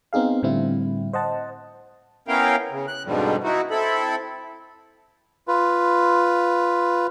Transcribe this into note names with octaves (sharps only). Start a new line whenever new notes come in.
B3 C4 D#4 G#4 F5
A2 D3 G3 C4 E4
C5 D#5 F#5 A5
B3 C#4 E4 A#4 F5 G5
C#3
F#6
F2 G#2 B2 D3 F3 G3
D#4 E4 F#4
C4 E4 A4 B5
F4 B4